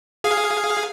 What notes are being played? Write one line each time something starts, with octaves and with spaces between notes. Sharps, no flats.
G#4 F5